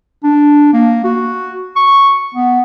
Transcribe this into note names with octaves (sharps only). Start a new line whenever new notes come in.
D4
A#3
F#4
C#6
B3